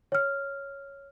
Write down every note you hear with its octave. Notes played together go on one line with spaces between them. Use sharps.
C#5 F6